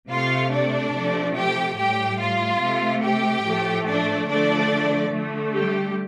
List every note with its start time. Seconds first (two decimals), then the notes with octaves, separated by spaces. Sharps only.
0.10 C3 A3 F4 F5
0.52 D4 D5
0.95 C3 F3 A3
1.36 G4 G5
1.78 A2 G3 G4 G5
2.19 F4 F5
2.61 C3 A3
3.03 G4 G5
3.44 A2 F3 A3
3.87 D4 D5
4.29 D3 F3 A3 D4 D5
5.12 D3 A3
5.54 G3 G4